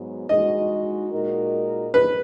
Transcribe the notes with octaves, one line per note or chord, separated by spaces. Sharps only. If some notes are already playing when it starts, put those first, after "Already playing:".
Already playing: G#2 F#3 B3 F#4
G#3 D#4 F#4 D#5
A#2 G#3 D#4 F#4 A#4
B4